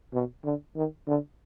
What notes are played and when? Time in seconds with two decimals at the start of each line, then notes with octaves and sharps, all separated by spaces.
0.14 B2
0.44 D3
0.76 D#3
1.08 D3